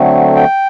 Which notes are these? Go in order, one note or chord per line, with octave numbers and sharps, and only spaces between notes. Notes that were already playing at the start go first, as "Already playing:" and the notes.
Already playing: D3 F#3 A3 C4
G5